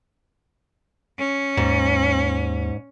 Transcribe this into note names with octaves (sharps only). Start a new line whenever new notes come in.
C#4
D#2 G#2